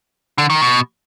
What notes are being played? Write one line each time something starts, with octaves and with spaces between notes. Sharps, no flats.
D3
D#3
B2